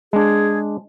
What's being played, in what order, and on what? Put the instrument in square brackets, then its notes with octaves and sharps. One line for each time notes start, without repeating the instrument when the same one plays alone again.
[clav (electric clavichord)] G#3 D4 [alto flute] G#4